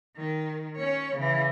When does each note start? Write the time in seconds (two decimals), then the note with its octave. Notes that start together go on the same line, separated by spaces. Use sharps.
0.17 D#3
0.77 C#4 C#5
1.17 C#3 E3